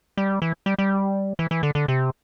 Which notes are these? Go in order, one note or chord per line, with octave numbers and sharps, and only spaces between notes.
G3
E3
G3
G3
E3
E3
D3
D3
C3